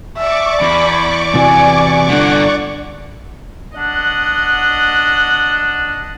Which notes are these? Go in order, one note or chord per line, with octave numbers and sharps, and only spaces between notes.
D5 E5 C#6 D6
E2 B5
C3 E3 F#4 G#5
G2 D3 F#5
D4 D#5 F#5